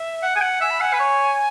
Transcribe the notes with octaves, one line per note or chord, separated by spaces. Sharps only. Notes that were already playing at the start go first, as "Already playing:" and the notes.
Already playing: E5
F#5
G#5
F#5
E5 G#5
B5
F#5 G#5
B4
C#5